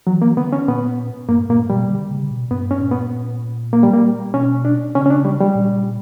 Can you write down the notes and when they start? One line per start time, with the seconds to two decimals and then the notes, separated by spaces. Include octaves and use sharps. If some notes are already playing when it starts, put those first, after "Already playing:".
0.07 E3 F#3
0.22 A#3
0.37 D3 B3
0.53 C#4
0.68 A#2 B3
1.28 G2 A#3
1.49 A#2 A#3
1.70 B2 G3
1.90 D3
2.11 C#3
2.31 B2
2.51 G2 B3
2.71 C#4
2.81 A#2
2.91 B3
3.73 A#3
3.83 G3
3.93 A#3
4.34 B2 C#4
4.65 D4
4.95 C#3 C#4
5.06 C#4
5.10 D4
5.25 G3
5.40 G3
5.55 A#2